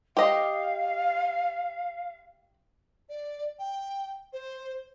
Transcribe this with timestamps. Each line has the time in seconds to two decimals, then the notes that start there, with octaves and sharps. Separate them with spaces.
0.17 G4 D#5 F5
3.09 D5
3.59 G5
4.33 C5